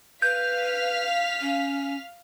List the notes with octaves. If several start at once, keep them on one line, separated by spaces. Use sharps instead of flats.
B4 F5 F6 G6 B6
C#4